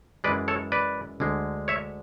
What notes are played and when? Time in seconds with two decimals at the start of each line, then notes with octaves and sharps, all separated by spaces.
0.24 F#2 E3 G#3 B4 D5
0.48 A4 C#5
0.72 B4 D5
1.20 D2 D3 G#3
1.68 C#5 E5